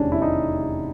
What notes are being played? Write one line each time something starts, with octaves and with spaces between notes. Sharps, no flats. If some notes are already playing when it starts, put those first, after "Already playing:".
Already playing: F1 E2 C3 D#3 G3 C#4 D4
E4
D#4